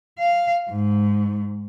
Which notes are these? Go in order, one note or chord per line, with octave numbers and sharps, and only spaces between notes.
F5
G#2